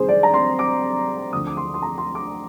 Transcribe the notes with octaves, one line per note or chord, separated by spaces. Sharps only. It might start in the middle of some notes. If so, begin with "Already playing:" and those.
Already playing: F2 C3 D#3 G3 G#4 C5
D5
A#5
C6
D6
D2 D3 F3 D#6
D6
C6
C6
A#5
C6
D6